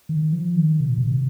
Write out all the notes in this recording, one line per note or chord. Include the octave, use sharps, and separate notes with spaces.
D#3
F3
D#3
C3
A#2
C3